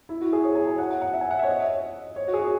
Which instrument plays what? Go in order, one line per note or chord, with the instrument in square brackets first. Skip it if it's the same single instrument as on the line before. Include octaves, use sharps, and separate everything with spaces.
[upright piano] E4
F#4
G#4
C#5
G#5
G#5
F#5
F#5
F#5
E5
G#5
F#5
E5
C#5
D#5
C#5
F#4
G#4
F#4